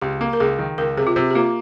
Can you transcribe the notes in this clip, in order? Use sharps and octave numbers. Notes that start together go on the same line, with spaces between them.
C#2 G4
A#3
A#4
C#2 G#4
D#3
C#2 A#4
C3 G#4
F4
C3 G4
G4
A#3 F4